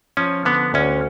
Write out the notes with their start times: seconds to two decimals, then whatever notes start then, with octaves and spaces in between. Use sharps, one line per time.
0.17 F3 C#4
0.45 D3 B3
0.74 D2 C#4